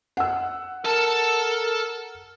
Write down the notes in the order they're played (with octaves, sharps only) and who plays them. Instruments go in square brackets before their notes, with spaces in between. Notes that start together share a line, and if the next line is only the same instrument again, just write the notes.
[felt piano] F#5 E6
[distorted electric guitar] A4 A5 [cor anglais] A#4